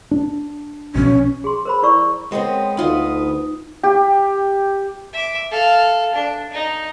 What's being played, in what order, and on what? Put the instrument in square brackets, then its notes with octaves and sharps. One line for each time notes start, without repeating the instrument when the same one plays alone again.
[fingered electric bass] D4
[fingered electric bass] B1 B2 F3 [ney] C#4
[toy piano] G#4 C6
A#4 C5 B5
E4 A4 A#4 D5 C#6 E6
[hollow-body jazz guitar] G#3 B3 C4 [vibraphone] A#4 C#5 G5
[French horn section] D2 [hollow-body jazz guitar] B3 F4 D#5 [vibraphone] D#4
[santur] G4
[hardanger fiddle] E5 D6
A4 F5
D4
D#4